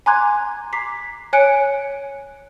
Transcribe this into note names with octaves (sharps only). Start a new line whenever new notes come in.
G#5 A#5 C6 D6 F#6 G#6
A#5 D6 B6 C7
C#5 G#5 F#6 C#7 D7